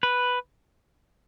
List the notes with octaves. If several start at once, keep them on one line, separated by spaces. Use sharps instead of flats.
B4